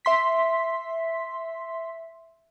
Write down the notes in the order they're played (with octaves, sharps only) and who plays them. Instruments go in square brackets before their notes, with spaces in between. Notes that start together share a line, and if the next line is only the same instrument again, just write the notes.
[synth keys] E5 C6 B6